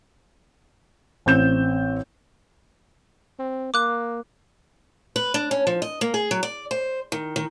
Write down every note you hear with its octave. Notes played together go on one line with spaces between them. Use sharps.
A1 C4 G6 E7
C4
A#3 D6 F#6
B4
D4
C#4
F3
D#5
A#3
G#4
F#3
D5
C5
D#3
D#3